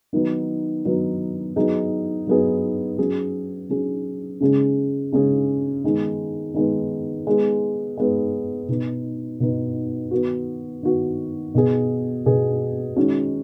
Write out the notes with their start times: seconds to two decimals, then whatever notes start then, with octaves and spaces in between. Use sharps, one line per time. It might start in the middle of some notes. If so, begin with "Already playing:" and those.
0.13 D#3 F#3 B3 D#4
0.85 D#3 F#3 B3 D#4
1.56 F#3 B3 D#4 G#4
2.27 F#3 B3 D#4 G#4
2.98 F#3 C#4 G#4
3.69 F#3 C#4 G#4
4.40 C#3 G#3 C#4 G#4
5.12 C#3 G#3 C#4 G#4
5.84 D#3 G#3 B3
6.54 D#3 G#3 B3
7.27 G#3 B3 G#4
7.97 G#3 B3 G#4
8.68 B2 B3 D#4
9.40 B2 B3 D#4
10.11 D#3 B3 F#4
10.83 D#3 B3 F#4
11.55 B2 B3 G#4
12.26 B2 B3 G#4
12.96 D#3 G#3 C#4 F#4